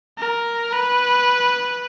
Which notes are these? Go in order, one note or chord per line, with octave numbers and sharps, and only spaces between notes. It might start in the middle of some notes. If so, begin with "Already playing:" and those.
A#4
B4